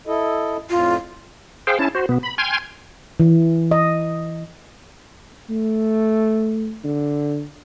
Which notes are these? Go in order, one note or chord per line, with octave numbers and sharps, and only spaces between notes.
E4 A4 D#5
F2 A2 F4
G#4 C5 F5 G5
C#4 E4 A5
F#4 C5
B2 B3
B5
G5 G#5 C6 F6 G#6
E3
D#5
A3
D3